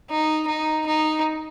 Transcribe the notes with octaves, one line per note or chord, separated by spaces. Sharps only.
D#4
D#4
D#4